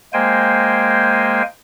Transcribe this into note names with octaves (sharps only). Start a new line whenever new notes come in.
G#3 A#3 C5 G5 G#5